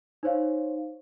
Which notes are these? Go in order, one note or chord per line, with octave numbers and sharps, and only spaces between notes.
D#4 C5 C#5 F5